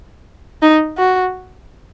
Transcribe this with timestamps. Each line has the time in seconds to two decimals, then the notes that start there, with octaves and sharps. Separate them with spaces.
0.62 D#4
0.98 F#4